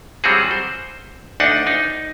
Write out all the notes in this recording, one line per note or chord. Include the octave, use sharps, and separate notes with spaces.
F#3 G3 C4 F#4 G#4
C5
D2 D4 D#4 F#5
D#4